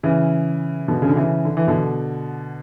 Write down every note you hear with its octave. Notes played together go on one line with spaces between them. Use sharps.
C#3 E3
B2 D3
C#3
D3
C#3 E3
D3
E3
B2 D3